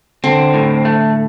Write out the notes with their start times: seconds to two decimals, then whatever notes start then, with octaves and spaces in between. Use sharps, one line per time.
0.24 D3 C4
0.54 A2
0.85 A3